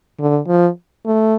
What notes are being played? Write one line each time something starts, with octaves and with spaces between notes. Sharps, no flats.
D3
F3
A3